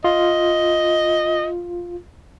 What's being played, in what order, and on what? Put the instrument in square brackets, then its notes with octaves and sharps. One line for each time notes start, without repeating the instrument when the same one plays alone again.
[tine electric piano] F4 [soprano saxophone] D#5